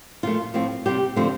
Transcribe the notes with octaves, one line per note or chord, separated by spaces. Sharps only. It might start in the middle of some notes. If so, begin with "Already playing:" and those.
A#2 F3 A3 F4
A2 F3 C4
C3 G3 C4 G4
D3 F3 A3 C4